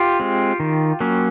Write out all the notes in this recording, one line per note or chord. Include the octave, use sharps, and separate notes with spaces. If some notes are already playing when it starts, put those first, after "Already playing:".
Already playing: F4 G4
G#3 C4
D#3
F#3 A#3 C#4